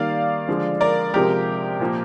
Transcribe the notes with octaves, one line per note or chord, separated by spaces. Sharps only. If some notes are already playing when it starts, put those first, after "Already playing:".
Already playing: D#3 G3 A#3 D5 F5
D3 F3 G#3
A#4 D5
C3 F3 G#3 G4 A#4
A#2 F3 A#3